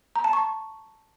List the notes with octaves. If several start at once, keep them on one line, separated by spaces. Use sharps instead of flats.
A#5
A5
C#6